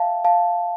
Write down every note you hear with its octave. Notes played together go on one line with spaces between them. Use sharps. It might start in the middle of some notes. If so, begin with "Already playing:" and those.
Already playing: E5 F5 G5 A5
F5 A5